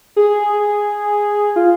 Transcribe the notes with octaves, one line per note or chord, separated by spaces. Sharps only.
G#4
F4